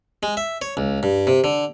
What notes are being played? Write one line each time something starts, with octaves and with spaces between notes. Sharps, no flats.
G#3
E5
C#5
C#2
G2
C3
D3